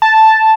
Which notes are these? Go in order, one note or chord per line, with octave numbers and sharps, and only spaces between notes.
A5